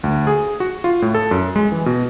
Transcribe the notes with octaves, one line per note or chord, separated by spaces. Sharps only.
D2
G#4
F#4
F4
A2
A4
F#2
G#3
E3
B2